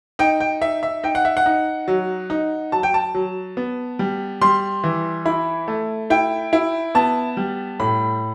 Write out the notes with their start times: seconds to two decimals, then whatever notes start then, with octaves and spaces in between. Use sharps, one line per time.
0.19 D#4 G5
0.40 G5
0.61 D#4 E5
0.83 E5
1.03 D#4 G5
1.15 F#5
1.25 E5
1.37 F#5
1.46 D#4
1.88 F#3
2.30 D#4
2.72 F#3 A5
2.83 G5
2.94 A5
3.15 F#3
3.57 B3
3.99 G3
4.42 G3 C6
4.84 E3
5.25 E4 B5
5.68 A3
6.10 E4 G5
6.53 E4
6.95 B3 A5
7.37 G3
7.80 A2 B5